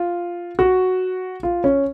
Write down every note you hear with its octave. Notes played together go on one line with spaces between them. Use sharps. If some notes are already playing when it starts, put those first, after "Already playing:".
Already playing: F4
F#4
F4
C#4